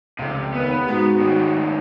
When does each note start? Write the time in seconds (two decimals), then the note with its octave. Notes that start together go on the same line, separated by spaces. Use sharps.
0.19 F1 C#2 C3
0.54 D#2 B3 B4
0.88 G#2 G#3 F#4
1.20 A2 D#3